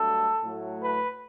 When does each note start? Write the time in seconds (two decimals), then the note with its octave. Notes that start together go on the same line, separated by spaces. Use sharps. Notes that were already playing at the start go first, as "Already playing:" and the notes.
Already playing: G2 F#3 A3 A4
0.43 A2 F#3 A3
0.81 B4